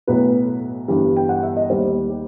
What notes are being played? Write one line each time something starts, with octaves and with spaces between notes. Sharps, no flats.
B1 A2 F#3 B4
G1 G2 E3 G3
G5
F#5
E5
D#5
D#2 D#3 G3 C5
G4